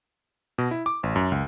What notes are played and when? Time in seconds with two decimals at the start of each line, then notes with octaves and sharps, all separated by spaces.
0.58 B2
0.71 E4
0.86 D6
1.03 A1
1.16 F#2
1.32 C#2